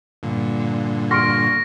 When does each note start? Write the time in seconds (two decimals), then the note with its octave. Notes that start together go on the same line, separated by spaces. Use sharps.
0.23 G2 A#2 D3
1.11 C6 C#6 F6 A#6 D7